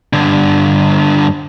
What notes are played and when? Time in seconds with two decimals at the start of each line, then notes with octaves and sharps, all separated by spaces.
0.13 G2 D3